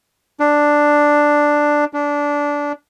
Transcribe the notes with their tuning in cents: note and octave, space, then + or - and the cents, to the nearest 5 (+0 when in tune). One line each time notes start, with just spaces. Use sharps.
D4 +5
D4 -15